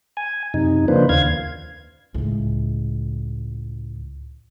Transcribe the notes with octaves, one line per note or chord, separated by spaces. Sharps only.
G#5
F#2 C3 D#4
C#3 F3 A#3 D4 B4 C5
D#2 F5 G#6
C#2 A2